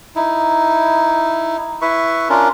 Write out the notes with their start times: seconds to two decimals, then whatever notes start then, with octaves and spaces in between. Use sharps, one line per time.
0.16 D#4 E4
1.82 E4 B4 E5 C#6
2.30 C#4 D4 F4 A#4